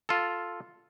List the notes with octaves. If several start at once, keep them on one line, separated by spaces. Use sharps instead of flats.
F4 A4